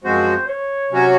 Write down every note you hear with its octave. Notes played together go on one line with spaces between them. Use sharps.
F#2 F3 G#3 C4 F#4 C5
C#5
C3 F#3 C#4 F#4